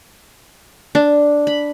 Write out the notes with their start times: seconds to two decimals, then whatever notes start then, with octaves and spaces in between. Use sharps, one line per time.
0.95 D4
1.47 B5